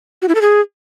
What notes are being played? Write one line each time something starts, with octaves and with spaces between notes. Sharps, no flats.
F#4
E4
A4
G#4